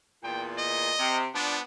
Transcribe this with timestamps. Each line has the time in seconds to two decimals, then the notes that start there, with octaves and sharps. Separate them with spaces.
0.23 E2 A#2 G5
0.58 D#5
0.99 C3
1.35 F3 B3 D4